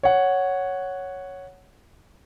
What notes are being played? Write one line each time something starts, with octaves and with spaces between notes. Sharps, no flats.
C#5 F#5